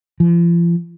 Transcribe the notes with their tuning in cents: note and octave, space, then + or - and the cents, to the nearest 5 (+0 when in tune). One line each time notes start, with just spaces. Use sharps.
F3 -40